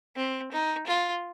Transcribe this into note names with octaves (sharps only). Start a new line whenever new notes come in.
C4
D#4
F4